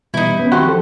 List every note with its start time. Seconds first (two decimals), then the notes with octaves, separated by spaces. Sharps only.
0.14 B2 E3 G3 D#4 E4
0.39 B3 C#4
0.52 D#3 C4 F#4 G4 C5 C#6
0.65 F3 A4